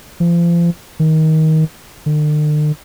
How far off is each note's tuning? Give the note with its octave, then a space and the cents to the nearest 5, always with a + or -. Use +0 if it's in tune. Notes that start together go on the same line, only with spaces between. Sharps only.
F3 -35
D#3 +20
D3 +45